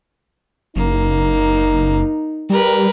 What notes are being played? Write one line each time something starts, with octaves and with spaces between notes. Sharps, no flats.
F#1 A#3 D#4
G3 A#4 B4